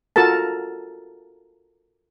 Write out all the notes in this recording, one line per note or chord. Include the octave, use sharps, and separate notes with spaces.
F4 F#4 A4 A#4 A5